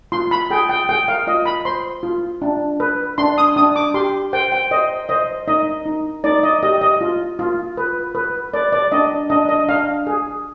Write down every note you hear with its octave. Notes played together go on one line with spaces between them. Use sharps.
F4 C6
B5
G#4 G5
G5
G#4 G5
F5
F4 D#5
B5
C5 C6
F4
D4
B4
D4 C6
D#6
D4 D#6
D6
G4 C6
C5 G5
G5
C5 D#5
C5 D#5
D#4 D#5
D#4
D#4 D5
D#5
G4 D#5
D#5
F4
F4
B4
B4
B4 D5
D5
D4 D#5
D4 D#5
D#5
D4 F5
G#4